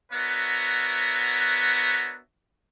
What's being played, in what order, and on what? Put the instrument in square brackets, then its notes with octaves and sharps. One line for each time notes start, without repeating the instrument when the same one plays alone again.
[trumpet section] B3 D4 F#4 A#4 C#5 E5